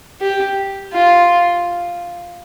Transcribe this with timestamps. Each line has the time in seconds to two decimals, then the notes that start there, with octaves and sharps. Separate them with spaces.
0.21 G4
0.93 F4